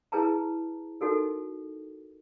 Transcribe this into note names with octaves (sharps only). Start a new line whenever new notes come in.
E4 G#4 B4 A5 A#5
D#4 F#4 A4 A#4